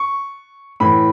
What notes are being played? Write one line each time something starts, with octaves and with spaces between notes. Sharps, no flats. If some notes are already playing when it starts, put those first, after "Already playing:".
Already playing: C#6
A2 E3 B5